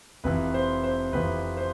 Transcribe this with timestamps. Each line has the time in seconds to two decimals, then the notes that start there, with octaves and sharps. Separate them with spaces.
0.24 F1 F2 E3 B4
0.54 C5
0.84 C5
1.12 F1 F2 E3 B4
1.57 C5